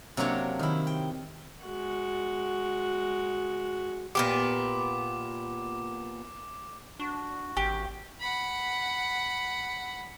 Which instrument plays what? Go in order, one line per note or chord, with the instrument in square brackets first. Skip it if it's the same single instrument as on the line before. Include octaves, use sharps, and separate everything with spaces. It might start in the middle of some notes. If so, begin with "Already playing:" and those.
[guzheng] C3 F#3 A#3 D4 C#5
D#3 E4
G5
[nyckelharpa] G#3 F#4
[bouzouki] A#2 B3 G4 [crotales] D6
[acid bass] D4 [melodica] F#4
[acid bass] G#1 [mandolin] G4
[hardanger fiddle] F#5 B5